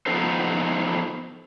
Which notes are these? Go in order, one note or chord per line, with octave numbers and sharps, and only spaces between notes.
F3 B3 D#4 A4 C5